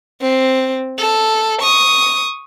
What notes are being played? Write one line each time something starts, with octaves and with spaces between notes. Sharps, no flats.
C4
A4
C#6 D#6